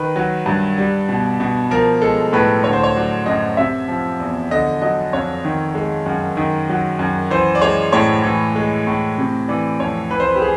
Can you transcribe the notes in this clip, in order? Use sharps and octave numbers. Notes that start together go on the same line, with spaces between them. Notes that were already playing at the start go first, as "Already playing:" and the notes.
Already playing: D#3 B4
F#3
G2
G3
B2
B2
F3 A#4
G#3 A4
A2 B4
D3 C#5
C5
C#5
F#3 D5
F#2 D#5
C3 E5
F3
E2
D3 D#5
F#3 D#5
F2 C#5
D#3
G#3
F#2
D#3
F#3
F#2
E3 C5
D5
G#3 C#5
A2 C#5
E3
G#3
A2
C3
E3 D5
F2 C#5
E3 B4
C5
B4
G4
G#4